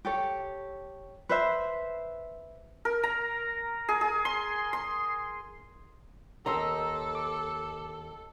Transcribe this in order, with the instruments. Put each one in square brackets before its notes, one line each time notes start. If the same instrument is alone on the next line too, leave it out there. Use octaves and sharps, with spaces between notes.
[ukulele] G4 A4 C#5
B4 C5 E5
[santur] A#4
A#5
G#4
G#4
C6
C6
[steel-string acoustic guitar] D#2 G4 D#5 [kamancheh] A4 [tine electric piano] A#5 C6 E6
[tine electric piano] D6